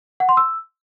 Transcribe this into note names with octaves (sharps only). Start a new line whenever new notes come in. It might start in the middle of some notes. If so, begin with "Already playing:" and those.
F#5
C6
E6